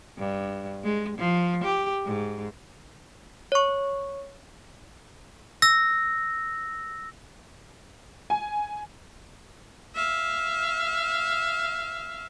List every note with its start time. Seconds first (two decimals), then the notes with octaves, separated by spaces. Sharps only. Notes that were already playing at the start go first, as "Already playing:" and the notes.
0.18 G2
0.84 G#3
1.18 F3
1.64 G4
2.05 G#2
3.52 C#5 C#6
5.62 E6 A#6
8.30 G#5
9.95 E5 F5